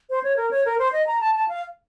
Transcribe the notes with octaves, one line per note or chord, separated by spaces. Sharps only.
C5
C#5
A#4
C#5
A#4
C5
D#5
A#5
A5
A5
F5